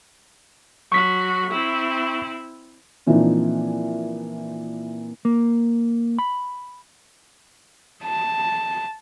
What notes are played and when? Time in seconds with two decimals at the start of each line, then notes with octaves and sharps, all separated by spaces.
0.92 F#3 F#4 C#6 B6
1.50 C4 E4
3.07 A#2 E3 F3 C4 D4 D#4
5.25 A#3
6.19 B5
8.04 A5